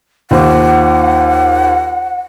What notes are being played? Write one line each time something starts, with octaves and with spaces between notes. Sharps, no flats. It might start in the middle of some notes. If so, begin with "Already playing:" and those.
D#2 F4 C5 F#5 D6